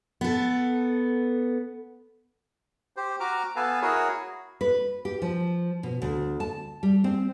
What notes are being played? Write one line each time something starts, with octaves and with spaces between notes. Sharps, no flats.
B3 A4
G4 C5
F#4 A#5 D6 F6
B3 A4 B4 F5 G#5 A5
E4 F#4 G#4 A#4 C#5
B4
G4
F3
B2
D2
A5
G3
C4